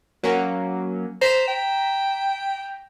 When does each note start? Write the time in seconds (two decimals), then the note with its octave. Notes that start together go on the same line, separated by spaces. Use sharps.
0.23 F#3 A#3 C#4
1.21 C5 A#5 B6 E7
1.47 G5